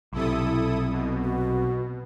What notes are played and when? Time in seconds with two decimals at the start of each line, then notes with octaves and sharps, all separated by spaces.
0.13 B1 C3 E4 A4 D#6
0.91 B2
1.25 F#4